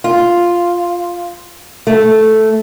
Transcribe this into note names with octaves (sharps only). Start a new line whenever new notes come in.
F4
A3